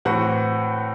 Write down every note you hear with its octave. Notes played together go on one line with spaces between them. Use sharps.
A2 E3 C4 F#4 F#5